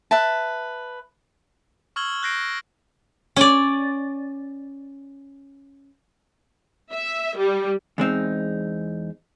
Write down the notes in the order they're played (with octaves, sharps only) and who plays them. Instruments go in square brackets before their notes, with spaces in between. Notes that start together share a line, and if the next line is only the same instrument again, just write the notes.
[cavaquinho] B4 E5 A5
[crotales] C#6 E6 F6 G#6 F#7 G7
F#6 G6 A#6 C7 D7
[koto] C#4 D5
[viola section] E5
G3
[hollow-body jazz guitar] E2 G#3 C4 D#4